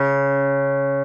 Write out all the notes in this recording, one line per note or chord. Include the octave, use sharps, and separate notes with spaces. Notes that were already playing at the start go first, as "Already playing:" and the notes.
Already playing: C#3